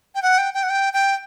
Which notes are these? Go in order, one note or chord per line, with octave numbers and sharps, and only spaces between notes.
G5
F#5
G5
G5
F#5
G5
G5